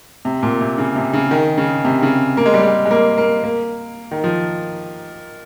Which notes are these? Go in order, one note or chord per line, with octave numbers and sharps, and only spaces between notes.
C3
A#2
C3
C#3
C3
C#3
D#3
C#3
C3
C#3
A#3
G#3
G3
G#3
G#3
A#3
A#3
A#3
D#3
F3